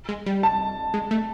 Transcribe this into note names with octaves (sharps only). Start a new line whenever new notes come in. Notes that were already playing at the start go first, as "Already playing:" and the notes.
G#3
G3
A5
G#3
A3